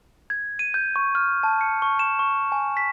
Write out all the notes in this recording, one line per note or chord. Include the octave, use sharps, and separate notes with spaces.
G#6
D#7
G6
C#6
F6
A5
C#7
C#6
E7
C#6
G#5
B6